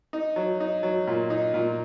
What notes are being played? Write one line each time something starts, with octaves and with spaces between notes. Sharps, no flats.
D#4
F#3
D#4
F#3
A#2
D#4
A#2